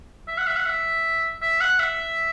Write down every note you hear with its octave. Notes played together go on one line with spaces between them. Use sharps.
E5
F#5
E5
F#5
E5
E5
F#5
E5